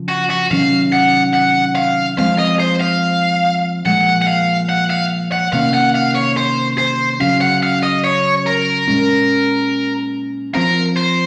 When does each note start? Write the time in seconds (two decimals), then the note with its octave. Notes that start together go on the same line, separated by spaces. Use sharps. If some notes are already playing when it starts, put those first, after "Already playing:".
Already playing: C#3 F3
0.08 F#4
0.30 F#4
0.51 C3 D#3 F#3 C#4 F5
0.92 F#5
1.34 F#5
1.76 F5
2.18 F3 G#3 C4 F5
2.39 D#5
2.60 C5
2.81 F5
3.85 A#2 F3 G#3 F#5
4.22 F#5
4.27 F5
4.69 F#5
4.90 F5
5.32 F#5
5.53 C3 D#3 A#3 C#4 F5
5.74 F#5
5.95 F5
6.15 C#5
6.37 C5
6.78 C5
7.20 C#3 F#3 C#4 F5
7.41 F#5
7.63 F5
7.83 D#5
8.04 C#5
8.47 A#4
8.88 A#2 G#3 C#4
10.55 F3 C4 A#4
10.97 C5